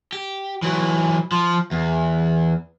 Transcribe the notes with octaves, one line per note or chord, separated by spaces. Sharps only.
G4
E3 F#3
F3
E2